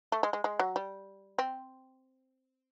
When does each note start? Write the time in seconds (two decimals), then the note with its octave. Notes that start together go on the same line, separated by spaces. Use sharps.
0.12 A3
0.23 G#3
0.33 G#3
0.44 G#3
0.60 F#3
0.76 G3
1.39 C4